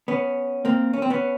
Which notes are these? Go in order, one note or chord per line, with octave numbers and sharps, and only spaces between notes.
B3 C#4
A#3 C4
C#4
C4
B3 C#4